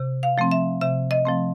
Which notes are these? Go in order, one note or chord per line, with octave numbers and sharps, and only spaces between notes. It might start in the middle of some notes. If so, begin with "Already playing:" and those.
Already playing: C3
F5
F3 A3 C4
E5
C3 E5
D#5
F3 A3 C4